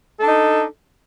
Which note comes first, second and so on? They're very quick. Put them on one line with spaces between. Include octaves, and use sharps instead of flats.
A4 D4 D#4